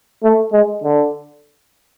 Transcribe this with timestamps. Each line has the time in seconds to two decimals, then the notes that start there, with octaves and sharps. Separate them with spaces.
0.23 A3
0.53 G#3
0.84 D3